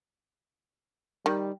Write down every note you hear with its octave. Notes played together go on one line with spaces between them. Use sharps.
D#3 G3